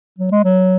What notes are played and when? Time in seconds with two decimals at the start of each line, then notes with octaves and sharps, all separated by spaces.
0.18 F#3
0.32 G#3
0.44 F#3